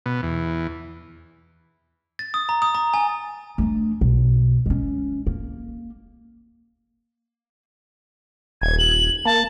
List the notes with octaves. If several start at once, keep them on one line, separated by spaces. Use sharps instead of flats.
B2
E2
A6
D#6
A#5
D#6
A#5
G#5
A3 D4
B1
G#3 C#4
A#3
D#1 G#6
F#7
A#3 A5